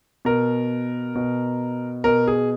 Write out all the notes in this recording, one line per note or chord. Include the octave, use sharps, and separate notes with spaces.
B2 A#4
B2
B2 A#4
G#4